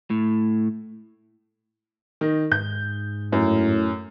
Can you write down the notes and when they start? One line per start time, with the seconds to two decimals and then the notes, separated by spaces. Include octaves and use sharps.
0.10 A2
2.21 D#3 D#4
2.52 G#2 G6
3.33 F#2 A2